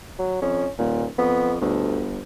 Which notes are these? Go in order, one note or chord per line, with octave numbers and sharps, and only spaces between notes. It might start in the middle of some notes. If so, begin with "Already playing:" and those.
F#3
F2 C#4
D#1 A#2
F2 B3
G1 D2